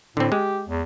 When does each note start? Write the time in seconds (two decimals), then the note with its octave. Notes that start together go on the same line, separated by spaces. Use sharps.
0.17 A2 D3 C4
0.32 G#3 G4
0.69 E2